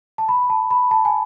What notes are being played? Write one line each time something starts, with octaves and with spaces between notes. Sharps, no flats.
A5
B5
A5
B5
A5
G#5